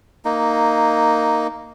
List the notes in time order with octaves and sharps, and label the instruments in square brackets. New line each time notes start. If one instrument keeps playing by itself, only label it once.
[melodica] A#3 D#4